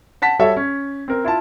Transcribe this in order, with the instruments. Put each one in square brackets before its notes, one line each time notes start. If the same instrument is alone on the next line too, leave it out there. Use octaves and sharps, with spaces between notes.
[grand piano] F#5 A5 B6
G3 F#4 A4 C#5 E5
C#4
C4 A#4
E4 F4 A5